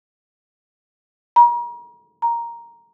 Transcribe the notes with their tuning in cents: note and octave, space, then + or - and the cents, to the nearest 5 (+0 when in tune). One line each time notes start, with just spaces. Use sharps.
A#5 +40
A#5 +5